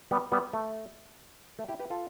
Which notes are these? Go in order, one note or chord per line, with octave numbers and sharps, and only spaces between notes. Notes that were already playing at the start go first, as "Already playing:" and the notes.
G3 B3
G3 B3
A3
A3
E4 G4
G4 B4
F4 A4